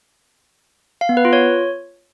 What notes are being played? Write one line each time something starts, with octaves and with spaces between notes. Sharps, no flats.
F5
B3
B4
F4
C#5